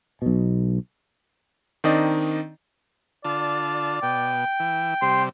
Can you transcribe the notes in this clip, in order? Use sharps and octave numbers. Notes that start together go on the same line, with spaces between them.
B1 B2
D#3 C4 D4 D#4 D5 D#5
D3 F4 D5 A5
B2 G5
E3
C3 G3 C6